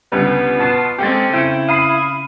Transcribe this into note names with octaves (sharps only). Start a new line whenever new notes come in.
C#2 D3 G3 B3
B2 F4 A5 E7
G#3 C4 C#4 G4 A4 A6
C#3 E4 G5 D7
F5 B5 D#6 C7